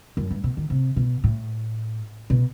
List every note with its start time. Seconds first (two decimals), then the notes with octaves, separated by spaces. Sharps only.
0.17 F#2
0.30 G2
0.44 B2
0.57 D#3
0.70 C3
0.96 B2
1.24 A2
2.30 B2